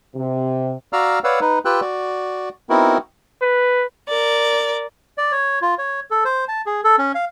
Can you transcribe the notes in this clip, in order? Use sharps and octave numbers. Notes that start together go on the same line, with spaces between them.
C3
F#4 D5 F5 A#5 E6 F6
B4 C#5 D5 F5 F#5 E6
D#4 B4
F4 G4 B4 G5 E6 F#6
F#4 D5
B3 C4 D#4 E4 F#4 A#4
B4
A#4 D5
D5
C#5
F4
C#5
A4
C5
A5
G#4
A4
C#4
F5